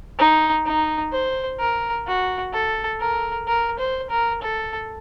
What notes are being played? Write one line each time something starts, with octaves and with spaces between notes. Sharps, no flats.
D#4
D#4
C5
A#4
F#4
A4
A#4
A#4
C5
A#4
A4